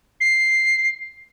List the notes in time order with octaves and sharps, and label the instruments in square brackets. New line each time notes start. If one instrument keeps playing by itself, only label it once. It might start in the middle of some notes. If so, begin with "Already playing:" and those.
[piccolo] C7